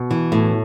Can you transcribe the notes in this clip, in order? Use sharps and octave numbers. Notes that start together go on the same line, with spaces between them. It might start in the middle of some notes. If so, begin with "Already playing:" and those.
Already playing: B2
E3
A2